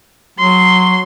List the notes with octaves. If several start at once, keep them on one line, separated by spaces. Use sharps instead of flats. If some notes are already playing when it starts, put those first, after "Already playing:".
F#3 C6